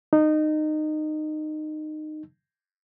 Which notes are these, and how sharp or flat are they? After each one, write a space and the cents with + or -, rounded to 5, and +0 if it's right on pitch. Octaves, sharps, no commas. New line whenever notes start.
D#4 -20